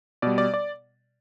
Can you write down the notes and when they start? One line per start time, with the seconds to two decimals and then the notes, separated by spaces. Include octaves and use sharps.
0.22 B2 G3 D5
0.38 D5
0.54 D5